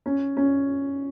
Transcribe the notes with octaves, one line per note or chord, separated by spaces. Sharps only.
C#4
C#4